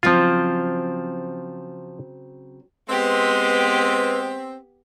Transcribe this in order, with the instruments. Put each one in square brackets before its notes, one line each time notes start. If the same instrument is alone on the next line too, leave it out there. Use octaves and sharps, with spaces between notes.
[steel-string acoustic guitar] C#3 F#3 C4 [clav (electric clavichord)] F3 F4
[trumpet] G#3 [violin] B3 G4 [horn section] C4 [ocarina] B4